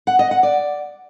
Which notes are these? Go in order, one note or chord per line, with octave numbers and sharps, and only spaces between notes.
F#5
D#5
F#5
D5